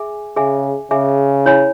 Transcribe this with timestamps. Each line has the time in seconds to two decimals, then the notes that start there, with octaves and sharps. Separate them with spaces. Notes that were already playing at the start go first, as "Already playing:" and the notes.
Already playing: G#4 E5 G#5
0.36 C#3 G#4 E5 G#5
0.91 C#3 G#4 E5 G#5
1.46 E4 C#5 G#5 B5